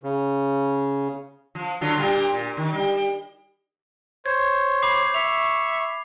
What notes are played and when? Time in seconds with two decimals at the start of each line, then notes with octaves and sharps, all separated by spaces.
0.03 C#3
1.55 F3
1.81 D3 F#3 F4
1.97 A#2 G3 A#3
2.34 A#2
2.57 D#3
2.73 G3
4.26 C5 C#5 G#6
4.82 B5 D6 C7
5.14 E5 C#6 F7